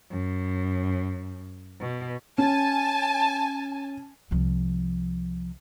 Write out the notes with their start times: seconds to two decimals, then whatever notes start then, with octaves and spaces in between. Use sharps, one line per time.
0.11 F#2
1.80 B2
2.38 C#4 G#5 A5
4.31 C2 F3